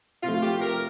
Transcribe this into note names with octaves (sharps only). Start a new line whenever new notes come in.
C3 F3 A3 F4
G4
A#4